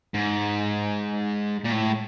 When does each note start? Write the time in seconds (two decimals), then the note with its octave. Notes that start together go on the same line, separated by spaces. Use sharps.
0.14 G#2
1.64 A#2
1.72 A2